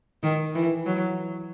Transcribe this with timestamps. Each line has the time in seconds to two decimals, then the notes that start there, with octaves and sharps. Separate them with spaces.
0.23 D#3
0.54 E3
0.86 F#3